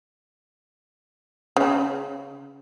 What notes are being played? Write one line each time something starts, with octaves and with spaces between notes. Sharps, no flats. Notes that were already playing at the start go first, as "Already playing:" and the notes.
C#3